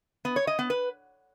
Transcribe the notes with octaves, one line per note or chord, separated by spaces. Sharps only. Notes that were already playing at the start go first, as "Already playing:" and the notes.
B3
C#5
D#5
B3
B4